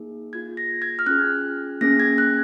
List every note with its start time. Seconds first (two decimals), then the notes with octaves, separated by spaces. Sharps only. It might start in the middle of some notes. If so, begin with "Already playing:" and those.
Already playing: A#3 D#4 G#4
0.33 A#3 F4 G#4 G#6
0.57 A#6
0.82 G#6
0.99 F6
1.06 C#4 F4 G#4 F#6
1.81 A#3 C#4 G#4 A#6
2.00 G#6
2.18 F#6